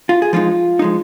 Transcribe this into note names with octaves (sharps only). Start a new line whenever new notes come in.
F4
G#4
F3 G#3 D#4 F4
F3 G#3 D#4